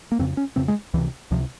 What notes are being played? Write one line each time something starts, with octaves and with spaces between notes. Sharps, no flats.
A#3
F2 C#3 C4
C#4
F2 C#3 C4
G#3
C#2 C3 E3
C#2 C3 F3